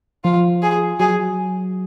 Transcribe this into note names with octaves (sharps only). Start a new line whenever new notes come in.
F3 F4
G#4
F#3 G#4